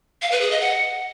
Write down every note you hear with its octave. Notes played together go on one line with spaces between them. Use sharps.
F5
B4
G#4
D#5
F#5